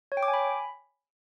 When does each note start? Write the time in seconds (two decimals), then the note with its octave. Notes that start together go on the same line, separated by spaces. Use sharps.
0.12 C#5
0.17 G5
0.23 D6
0.28 G#5
0.34 B5